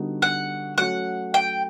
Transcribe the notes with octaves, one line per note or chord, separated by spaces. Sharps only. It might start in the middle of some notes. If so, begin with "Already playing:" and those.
Already playing: D3 G3 B3 D#4 F#4
F#5
F#3 A3 C#4 F#4 F#5
G5